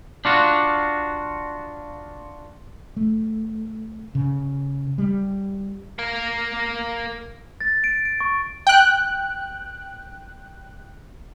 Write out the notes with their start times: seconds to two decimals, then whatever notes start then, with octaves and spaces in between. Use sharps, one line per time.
0.25 D4 F4 F#4
2.97 A3
4.15 C#3
4.98 G3
5.99 A#3 A#4
7.60 A6
7.84 D7
8.05 D7
8.20 C#6
8.67 G5 F#6